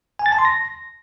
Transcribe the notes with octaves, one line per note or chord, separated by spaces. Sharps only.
G#5
A6
A5
C6
A#6